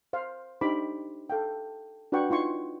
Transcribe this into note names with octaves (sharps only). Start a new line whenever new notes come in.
C5 F5
D4 D#4 G4 C5 B5 D6
A4 F5 G5
D4 F#4 B4 F#5 G5 C#6
D#4 F4 C6 C#6